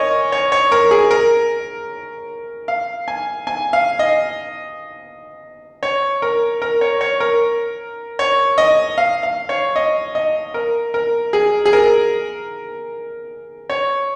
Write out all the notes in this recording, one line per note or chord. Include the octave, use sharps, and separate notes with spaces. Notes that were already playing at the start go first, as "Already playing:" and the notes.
Already playing: A#4 C#5 D#5 G#5
C#5
C#5
A#4
G#4
A#4
F5
G#5
G#5
F5
D#5
C#5
A#4
A#4
C#5
C#5
A#4
C#5
D#5
F5
F5
C#5
D#5
D#5
A#4
A#4
G#4
G#4
A#4
C#5